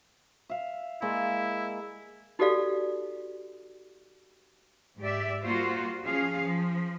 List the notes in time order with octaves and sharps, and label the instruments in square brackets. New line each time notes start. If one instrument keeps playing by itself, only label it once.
[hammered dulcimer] E5 F5
[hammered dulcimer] G#3 A#3 D5 [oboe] E4
[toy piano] D#4 F#4 G4 A4 D5 F5
[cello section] G#2 G4 D5 E5
G3 A#3 F4 F#4 C5
F3 C#4 G#4 F5
F3